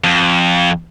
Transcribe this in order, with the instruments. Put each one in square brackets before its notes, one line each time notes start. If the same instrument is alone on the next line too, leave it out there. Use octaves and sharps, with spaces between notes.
[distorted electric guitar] F2